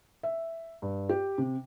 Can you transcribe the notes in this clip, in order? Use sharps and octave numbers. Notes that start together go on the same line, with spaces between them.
E5
G2
G4
C3